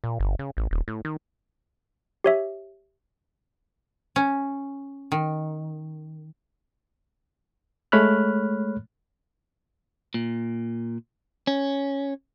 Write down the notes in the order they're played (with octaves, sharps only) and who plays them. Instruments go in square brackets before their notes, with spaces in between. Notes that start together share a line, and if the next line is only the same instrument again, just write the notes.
[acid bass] A#2
G1
C#3
A1
D#1
A2
D#3
[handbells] G4 C#5 E5
[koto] C#4
D#3
[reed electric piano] G#3 A3 C#5 B5 F6 F#6
[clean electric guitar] A#2
C#4